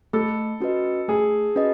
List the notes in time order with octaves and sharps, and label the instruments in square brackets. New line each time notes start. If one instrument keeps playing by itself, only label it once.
[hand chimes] A3 [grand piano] A4
[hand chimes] C#4 F#4 B4 D#5
[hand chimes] A3 [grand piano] G#4
[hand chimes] C#4 F#4 B4 D#5